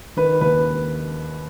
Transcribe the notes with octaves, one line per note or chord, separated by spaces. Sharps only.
D#3 B4
D#2 B4